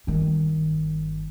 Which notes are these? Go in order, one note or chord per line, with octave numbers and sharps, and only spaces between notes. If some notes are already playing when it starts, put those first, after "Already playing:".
G1 D#3